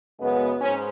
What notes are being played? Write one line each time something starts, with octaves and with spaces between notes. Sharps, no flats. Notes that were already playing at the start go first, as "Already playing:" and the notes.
F#2 C#3 G#3 B3
G#2 C#4